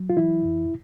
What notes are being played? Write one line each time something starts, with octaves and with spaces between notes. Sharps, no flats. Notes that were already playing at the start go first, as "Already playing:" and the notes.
Already playing: F#3
F4
E3 E4
F2